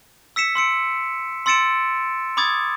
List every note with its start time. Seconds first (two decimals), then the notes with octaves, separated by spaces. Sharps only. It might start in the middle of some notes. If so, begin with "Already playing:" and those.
0.36 E6 B6 C#7 E7
0.55 C6 E6 C#7 D7
1.46 C6 E6 A6 C#7 D7 E7
2.37 B5 D6 D#6 G#6 A6